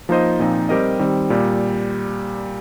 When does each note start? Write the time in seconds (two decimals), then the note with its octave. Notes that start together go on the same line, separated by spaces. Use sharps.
0.09 F3 A#3 D#4 C5 D#5
0.39 A#2 F3 C4 D#4
0.69 G3 C4 G4 A#4 D#5
0.99 D#3 G3 C4
1.30 A#2 G3